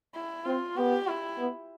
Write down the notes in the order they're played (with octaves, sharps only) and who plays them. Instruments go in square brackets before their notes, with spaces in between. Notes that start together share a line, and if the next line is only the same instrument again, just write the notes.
[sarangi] E4
[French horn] C4 [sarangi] F4
[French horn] B3 [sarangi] G4
[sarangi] E4
[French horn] B3